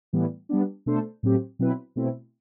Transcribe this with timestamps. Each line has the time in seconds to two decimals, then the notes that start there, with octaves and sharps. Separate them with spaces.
0.13 A2 E3 G3 B3
0.49 G3 B3 D4
0.86 B2 A3 D4 A4 C5
1.23 A2 F#3 C4 G4
1.59 B2 F#3 C4 E4 B4
1.96 B2 A3 C4 E4